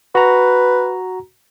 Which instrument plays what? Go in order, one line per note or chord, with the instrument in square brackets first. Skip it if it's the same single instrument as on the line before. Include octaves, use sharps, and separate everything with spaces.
[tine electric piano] F#4 A#5 [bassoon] B4